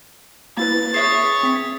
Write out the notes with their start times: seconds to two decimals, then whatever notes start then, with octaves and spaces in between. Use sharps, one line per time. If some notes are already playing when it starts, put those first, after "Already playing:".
0.57 A#3 E4 B4 A6
0.94 G#4 C#5 E5 D#6
1.43 C4 B6